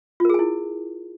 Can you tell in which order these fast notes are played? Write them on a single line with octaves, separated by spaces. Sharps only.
F4 A#4 G#4 G#5 E4